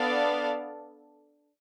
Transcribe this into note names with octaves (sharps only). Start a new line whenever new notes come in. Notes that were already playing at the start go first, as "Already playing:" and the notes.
Already playing: B3 D4 A4 D5 F5